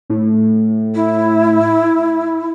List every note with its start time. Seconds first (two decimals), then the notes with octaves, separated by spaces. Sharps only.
0.10 A2
0.94 E4